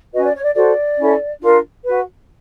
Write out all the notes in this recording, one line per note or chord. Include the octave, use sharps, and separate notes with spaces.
C#4 F#4 B4 D#5
D5
C#5
D5
F#4 A4 C5 D5
C#4 E4 A4
D4 F4 A#4
F#4 B4